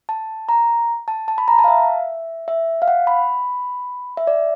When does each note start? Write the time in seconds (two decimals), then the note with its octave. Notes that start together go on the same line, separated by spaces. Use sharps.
0.09 A5
0.49 A#5
1.08 A5
1.28 A5
1.38 B5
1.48 A#5
1.59 A5
1.64 F5
1.68 E5
2.48 E5
2.82 F5
2.88 F#5
3.07 B5
4.17 E5
4.27 D5